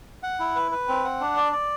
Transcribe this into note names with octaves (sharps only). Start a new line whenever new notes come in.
F#5
E4
B4
B4
C4
F#5
D4
D5
D5